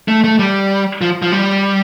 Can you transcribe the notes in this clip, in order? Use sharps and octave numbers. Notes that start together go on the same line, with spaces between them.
A3
A3
G3
F3
F3
G3